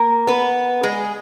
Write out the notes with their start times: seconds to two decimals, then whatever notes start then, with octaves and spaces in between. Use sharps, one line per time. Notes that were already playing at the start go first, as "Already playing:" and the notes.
Already playing: A#3 A#4
0.27 B3 B4
0.83 G#3 G#4